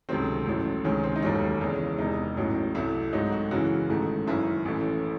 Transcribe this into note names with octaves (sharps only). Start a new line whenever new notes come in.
C#2 C3 D#3 F#3 A3 C4
A1 A2 F#3 A3
C#2 C3 D#3 G#3 C#4
C4
D#4
E1 D#2 D#3 F#3 A3 C#4
E2 C#3 E3 G#3
E1 E2 C3 D#4
A1 A2 F#3
C2 C3 F#3 A3 E4
G#1 G#2 F#3 A3 D#4
F#4
F#2 C#3 E3 F#4
A1 G#2 D#3 A3
F#1 F#2 D#3 E4
A1 A2 E3 A3